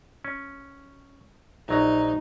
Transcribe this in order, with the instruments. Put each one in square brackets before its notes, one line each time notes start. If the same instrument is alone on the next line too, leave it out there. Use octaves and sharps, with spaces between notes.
[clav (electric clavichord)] C#4
[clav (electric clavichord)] A#1 F#3 A#5 [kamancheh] D#4